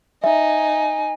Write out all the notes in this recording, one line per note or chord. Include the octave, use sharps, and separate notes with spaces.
D#4 E5 G#5